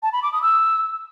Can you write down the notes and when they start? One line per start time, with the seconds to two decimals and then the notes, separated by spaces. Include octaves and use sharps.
0.03 A5
0.13 B5
0.23 D6
0.33 D#6
0.42 E6